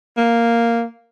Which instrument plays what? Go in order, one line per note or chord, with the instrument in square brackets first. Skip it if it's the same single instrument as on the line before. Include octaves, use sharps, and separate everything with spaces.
[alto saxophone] A#3